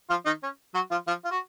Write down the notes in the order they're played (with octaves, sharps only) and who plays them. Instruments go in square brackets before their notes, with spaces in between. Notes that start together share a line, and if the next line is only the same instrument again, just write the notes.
[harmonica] F3 F4
D#3 D#4
C#4
F#3 F#4
F3 F4
F3 F4
F4
F#4